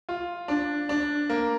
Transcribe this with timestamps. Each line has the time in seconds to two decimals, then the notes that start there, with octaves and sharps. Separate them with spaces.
0.09 F4
0.48 D4
0.89 D4
1.30 A#3